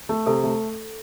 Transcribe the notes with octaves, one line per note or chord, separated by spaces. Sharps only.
A3
C3 A4
A3